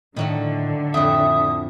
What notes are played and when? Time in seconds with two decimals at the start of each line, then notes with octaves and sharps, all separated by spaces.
0.16 A2 D3 D#3 F#3 A3
0.94 F2 A2 E5 D#6